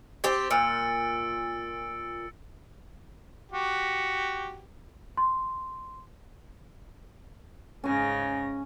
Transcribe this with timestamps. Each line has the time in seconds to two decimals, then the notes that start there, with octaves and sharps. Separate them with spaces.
0.24 C4 G4 A6
0.50 A#2 E6 C#7 D7
3.52 F#4 G4
5.17 C6
7.84 G#2 C#3 C#4 G#5 A#6